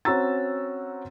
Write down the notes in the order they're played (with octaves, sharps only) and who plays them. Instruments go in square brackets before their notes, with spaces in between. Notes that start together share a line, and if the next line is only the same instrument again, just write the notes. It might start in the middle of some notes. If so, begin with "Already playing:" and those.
[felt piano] C4 C#4 F#4 A#5 E6 A6